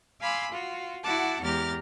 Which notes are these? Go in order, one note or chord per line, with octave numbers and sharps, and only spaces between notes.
F5 G#5 B5 C6 D6 E6
F4 F#4
E4 F#4 F#5 A5 D6
E2 G#3 G4 A#5 F6 A6